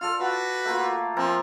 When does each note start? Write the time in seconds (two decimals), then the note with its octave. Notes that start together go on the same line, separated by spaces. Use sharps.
0.01 F4 A4 D5 F6
0.20 F#4 B4 F#5
0.65 A3 A#3 F4
1.17 F3 A#3 C4 A#4